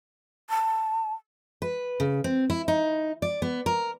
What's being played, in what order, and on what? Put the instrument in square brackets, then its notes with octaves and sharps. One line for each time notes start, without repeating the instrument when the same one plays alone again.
[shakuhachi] A5
[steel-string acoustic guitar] B4
C#3
C4
E4
D#4
D5
B3
A#4